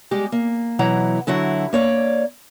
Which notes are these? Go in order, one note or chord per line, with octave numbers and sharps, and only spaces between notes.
G3 G#3 G4
A#3
B2 E3 F#3 E4 F#5 A#5
D3 F#3 E4 F#4
A#3 C#5 D5